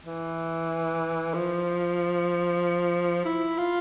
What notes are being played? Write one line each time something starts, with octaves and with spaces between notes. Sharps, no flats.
E3
F3
E4
F4